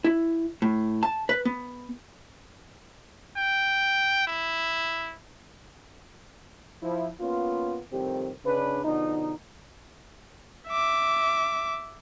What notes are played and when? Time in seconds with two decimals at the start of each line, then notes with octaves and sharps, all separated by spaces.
0.04 E4
0.62 A2
1.03 A5
1.29 B4
1.45 B3
3.37 G5
4.27 E4
6.82 F3 E4
7.20 A#3 B3 C#4 F4
7.91 C2 F2 A2 D#3 C4 G4
8.44 C#3 D4 B4
8.83 B2 D3 F3 D#4
10.68 E5 D6